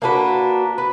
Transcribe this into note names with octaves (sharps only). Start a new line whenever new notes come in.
A#3 D4 F#4 B4
B4